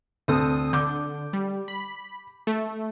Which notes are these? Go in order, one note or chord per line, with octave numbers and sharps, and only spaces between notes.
D2 C4 A4 D#6
D3 D6 G6
G3
B5
A3